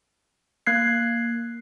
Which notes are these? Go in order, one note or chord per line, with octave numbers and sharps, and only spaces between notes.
A#3 F#6 G#6 C7